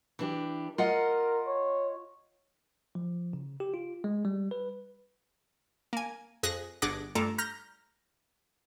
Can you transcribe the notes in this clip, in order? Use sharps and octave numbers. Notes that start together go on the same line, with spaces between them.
E3 D4 G4
F4 A#4 D#5 F#5
C#5
F3
C#3
G4
F4
G#3
G3
B4
A#3 G#5
F2 G#4 D#6 F#6 A#6
G1 D4 G#4 F#5 D6 A#6
G2 A3 F4 A4 D5 A#5
A#5 F6 G6 A#6